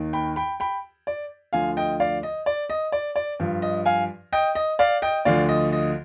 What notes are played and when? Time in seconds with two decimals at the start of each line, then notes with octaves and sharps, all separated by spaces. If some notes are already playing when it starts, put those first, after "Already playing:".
Already playing: D#2 D#3
0.13 G5 B5
0.36 G5 B5
0.60 G5 B5
1.07 D5
1.53 D2 D3 F3 F5 G#5
1.77 D#5 G5
2.00 D5 F5
2.23 D#5
2.46 D5
2.70 D#5
2.92 D5
3.16 D5
3.40 G2 F3
3.62 D#5
3.86 F5 G#5
4.33 D#5 G5
4.55 D#5
4.79 D5 F5
5.02 D#5 G5
5.25 D2 D3 F3 D5 F5
5.49 D#5
5.72 D#5